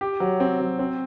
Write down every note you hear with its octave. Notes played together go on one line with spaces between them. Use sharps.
G4
F#3
C4
F#3
C4